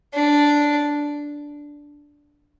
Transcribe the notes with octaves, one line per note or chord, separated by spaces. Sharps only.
D4